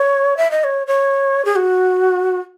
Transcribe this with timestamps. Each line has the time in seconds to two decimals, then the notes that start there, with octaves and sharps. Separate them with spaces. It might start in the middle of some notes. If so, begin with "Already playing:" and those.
Already playing: C#5
0.37 E5
0.51 D#5
0.64 C#5
0.87 C#5
1.45 G#4
1.56 F#4